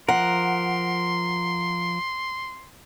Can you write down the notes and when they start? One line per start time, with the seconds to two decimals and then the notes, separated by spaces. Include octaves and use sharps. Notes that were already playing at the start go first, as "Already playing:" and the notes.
0.08 F3 A#4 F#5 C6